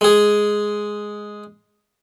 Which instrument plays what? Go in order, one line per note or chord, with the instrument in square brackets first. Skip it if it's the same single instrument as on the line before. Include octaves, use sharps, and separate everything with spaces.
[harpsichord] G#3 G#4